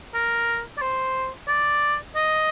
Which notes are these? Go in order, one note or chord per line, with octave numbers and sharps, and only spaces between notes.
A#4
D5
C5
D5
D#5